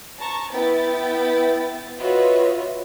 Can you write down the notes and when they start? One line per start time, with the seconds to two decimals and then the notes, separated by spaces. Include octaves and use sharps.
0.19 A5 A#5 C#6
0.51 B3 E4 G5 A6
2.00 F4 F#4 B4 C#5 D#5 E5